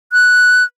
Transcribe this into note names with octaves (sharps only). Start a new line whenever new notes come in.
F#6